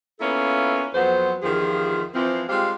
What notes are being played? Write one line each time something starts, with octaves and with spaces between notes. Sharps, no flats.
A#3 B3 C#4 E4 F4 A4
F2 F#3 B3 C4 C5
E2 D#3 F3 F4 G4 G#4
E3 F3 C4
G3 G#3 C4 F4 G4 F5